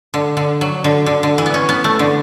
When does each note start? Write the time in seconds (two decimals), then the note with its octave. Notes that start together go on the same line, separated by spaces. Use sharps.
0.14 D3
0.37 D3
0.61 F#3
0.84 D3
1.06 D3
1.23 D3
1.38 E3
1.46 B3
1.54 C#4
1.69 B3
1.84 A3
1.99 D3